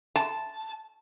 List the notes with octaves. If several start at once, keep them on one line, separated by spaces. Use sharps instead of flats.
A5